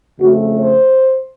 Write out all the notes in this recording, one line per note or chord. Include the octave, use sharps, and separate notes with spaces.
F2 C#3 A3 F#4
C5